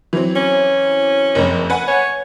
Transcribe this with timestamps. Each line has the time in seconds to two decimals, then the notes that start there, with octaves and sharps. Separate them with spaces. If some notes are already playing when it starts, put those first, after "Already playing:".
0.13 E3 F#3 C4
0.36 C#4
1.35 F#1 F2
1.70 B4 F#5 G#5
1.87 C#5